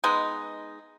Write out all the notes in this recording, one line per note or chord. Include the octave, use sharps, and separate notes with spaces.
G#3 B3 D#4